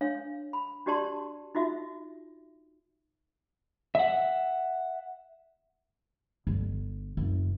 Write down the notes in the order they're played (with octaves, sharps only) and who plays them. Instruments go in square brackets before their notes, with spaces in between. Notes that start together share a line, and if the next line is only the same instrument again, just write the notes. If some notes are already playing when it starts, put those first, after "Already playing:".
[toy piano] D4 C#5 F5
B5
D4 F#4 G4 D5 A5 C6
D#4 F4 F#4 E5
[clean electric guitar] E5 F#5
[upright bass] G1
F#1